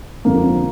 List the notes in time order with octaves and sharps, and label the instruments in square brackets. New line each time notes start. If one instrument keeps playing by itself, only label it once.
[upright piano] F2 D3 F3 A#3